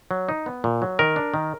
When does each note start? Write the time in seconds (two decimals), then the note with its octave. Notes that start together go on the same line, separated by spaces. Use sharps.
0.11 F#3
0.29 D#4
0.46 B3
0.64 A#2
0.82 F#3
0.99 D#3 A#4
1.16 D4
1.34 D#3